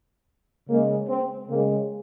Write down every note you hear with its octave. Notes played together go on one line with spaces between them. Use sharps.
C#3 G#3 A#3
C4
C#3 G#3 A#3